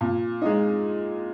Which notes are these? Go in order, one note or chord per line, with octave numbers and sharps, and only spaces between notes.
A#2
G#3 D#4